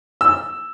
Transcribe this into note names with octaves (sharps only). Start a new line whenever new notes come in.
E6